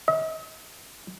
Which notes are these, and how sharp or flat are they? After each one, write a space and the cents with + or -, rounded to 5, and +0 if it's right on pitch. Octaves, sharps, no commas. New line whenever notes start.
D#5 +45